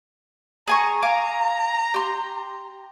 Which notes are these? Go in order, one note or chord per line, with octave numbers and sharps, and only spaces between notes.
G#4 G#5 A#5 C#6
F5 G#5 A#5 D6
G4 C6